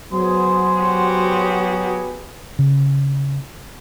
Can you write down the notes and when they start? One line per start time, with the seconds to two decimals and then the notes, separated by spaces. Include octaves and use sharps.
0.13 F#3 B3 G#4 C5
0.80 F#4 G4
2.59 C#3